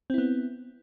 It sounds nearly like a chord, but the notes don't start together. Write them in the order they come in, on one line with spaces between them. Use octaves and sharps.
C4 E4 B3